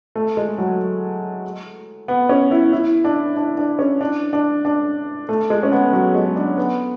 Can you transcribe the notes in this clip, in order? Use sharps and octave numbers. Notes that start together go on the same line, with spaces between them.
A3
G#3
F#3
B3
C#4
E4
E4
D4
D4
D4
C#4
D4
D4
D4
A3
G#3
C#4
B3
F#3
G#3
D4
B3